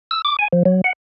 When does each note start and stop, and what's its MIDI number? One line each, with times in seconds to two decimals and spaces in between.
0.11 0.22 88
0.25 0.36 86
0.39 0.48 80
0.53 0.63 53
0.65 0.81 54
0.84 0.93 78